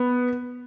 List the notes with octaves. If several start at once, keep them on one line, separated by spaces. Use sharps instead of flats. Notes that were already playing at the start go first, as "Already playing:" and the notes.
Already playing: B3